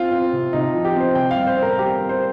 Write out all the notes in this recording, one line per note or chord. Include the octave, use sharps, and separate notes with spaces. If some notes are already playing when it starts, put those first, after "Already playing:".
Already playing: C4 F4
C4
C3
C3 D#4
F3
G4
C4 C5
C3 G5
F5
G3
C5
C4
A#4
G3 G4
C4
C5